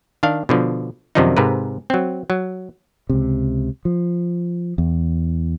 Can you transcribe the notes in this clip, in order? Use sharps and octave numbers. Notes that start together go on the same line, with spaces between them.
D#3 D4 F5
B2 D3 F3
F#2 C3 D#3 F3 D4 D#4
G#2 C3 A#4 B4
F#3 C4
F#3
C#2 C3
F3
E2